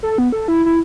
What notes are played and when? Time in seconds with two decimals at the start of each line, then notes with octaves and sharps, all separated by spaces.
0.03 A4
0.18 B3
0.32 A4
0.48 E4
0.66 E4